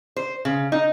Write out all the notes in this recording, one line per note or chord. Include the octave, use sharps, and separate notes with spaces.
C5
C#3
D#4